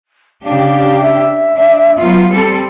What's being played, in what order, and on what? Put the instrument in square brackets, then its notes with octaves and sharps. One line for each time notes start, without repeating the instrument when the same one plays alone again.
[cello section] C#3 D4 G4 [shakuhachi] F5
[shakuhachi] E5
[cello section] D4
F#3 B3 F4
G3 C4 A4